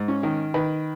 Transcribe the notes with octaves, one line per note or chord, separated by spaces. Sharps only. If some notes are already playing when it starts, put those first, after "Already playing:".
Already playing: G#2
C#4
D#3
D#3 B4